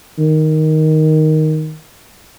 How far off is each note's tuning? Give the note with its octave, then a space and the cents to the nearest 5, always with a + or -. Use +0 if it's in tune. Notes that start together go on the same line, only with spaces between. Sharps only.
D#3 +5